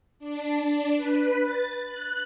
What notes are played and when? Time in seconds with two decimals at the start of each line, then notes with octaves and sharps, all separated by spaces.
0.19 D4
0.59 D4
0.97 B4
1.41 A6
1.83 F#6